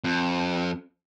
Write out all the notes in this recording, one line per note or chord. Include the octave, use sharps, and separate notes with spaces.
F2